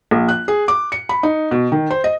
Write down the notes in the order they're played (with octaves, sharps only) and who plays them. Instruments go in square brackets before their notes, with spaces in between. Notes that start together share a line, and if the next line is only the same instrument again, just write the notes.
[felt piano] A#1
F#6
G#4
D6
C#7
B5
D#4
B2
D#3
C5
D#5